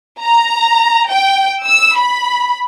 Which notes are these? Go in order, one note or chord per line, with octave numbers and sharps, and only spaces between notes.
A#5
G5
E6
B5